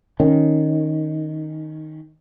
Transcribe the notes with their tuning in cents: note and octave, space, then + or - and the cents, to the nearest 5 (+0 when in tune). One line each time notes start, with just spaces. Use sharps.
D#3 +0 C#4 +0